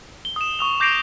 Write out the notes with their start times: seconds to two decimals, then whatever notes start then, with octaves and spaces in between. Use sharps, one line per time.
0.25 G7
0.36 D#6 E7
0.59 C#6 D#6 F7
0.80 D6 G6 A#6 C7 D7 F7